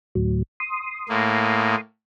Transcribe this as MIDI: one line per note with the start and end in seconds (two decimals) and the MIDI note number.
0.15 0.42 38
0.15 0.42 45
0.15 0.42 54
0.60 1.81 84
0.60 1.81 87
1.09 1.75 45
1.09 1.75 58